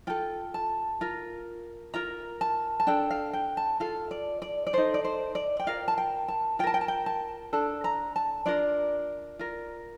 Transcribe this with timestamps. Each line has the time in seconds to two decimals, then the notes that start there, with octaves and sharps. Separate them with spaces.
0.07 F4 A4 G5
0.54 A5
1.01 F4 A#4
1.94 F4 A#4 A#5
2.41 A5
2.80 A5
2.87 D4 A4 G5
3.10 F5
3.33 G5
3.57 A5
3.80 F4 A4 F5
4.11 D5
4.42 D5
4.67 D5
4.73 D#4 A4 C5
4.94 D5
5.04 C5
5.35 D5
5.59 G5
5.67 F4 A#4 F5
5.88 A5
5.98 G5
6.28 A5
6.59 F4 G5
6.63 A#4 A5
6.74 G5
6.81 A5
6.88 G5
7.06 A5
7.53 D4 A4 A5
7.84 A#5
8.16 A5
8.46 D4 F4 A#4 D5
9.39 F4 A#4